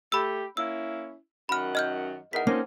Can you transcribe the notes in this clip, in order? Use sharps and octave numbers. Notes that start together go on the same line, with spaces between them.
A3 G4 B5 E6
A#3 C#4 E4 E6
F#2 D#3 F#5 B5 F6
D#5 F6 G6
E2 D#4 A#4 F#5 B6
F3 A#3 C4 C#4 D#4 A#4 C7